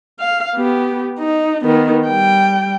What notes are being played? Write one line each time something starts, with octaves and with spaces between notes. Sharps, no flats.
F5
B3 G4
D#4
D#3 B3
G3 G5